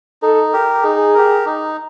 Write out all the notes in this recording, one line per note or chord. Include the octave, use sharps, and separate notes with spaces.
D#4 A4
G4 A#4
D#4 G#4
G4 A#4
D#4